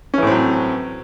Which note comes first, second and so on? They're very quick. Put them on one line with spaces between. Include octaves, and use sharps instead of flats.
C#4 E3 A2 C4 F#3